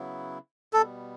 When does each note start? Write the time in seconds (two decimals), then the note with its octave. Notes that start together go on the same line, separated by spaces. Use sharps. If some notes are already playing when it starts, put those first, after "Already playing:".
Already playing: C#3 F#3 B3 E4
0.73 B2 G3 B3 A4